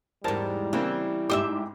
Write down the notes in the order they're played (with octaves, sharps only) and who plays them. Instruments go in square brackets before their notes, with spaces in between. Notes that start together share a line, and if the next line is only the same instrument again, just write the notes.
[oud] E2 G#2 [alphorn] G3 [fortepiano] A#4 C5 A5
[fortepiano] C#3 A#3 C4 [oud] E3
[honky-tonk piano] G#2 G4 D6 [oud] C5 D#5 E5